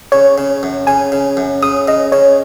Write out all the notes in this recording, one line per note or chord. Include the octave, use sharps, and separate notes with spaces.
C#3 C#5
C#3
F#2
C#3 G#5
C#3
F#2
C#3 D#6
C#3 D#5
C#3 C#5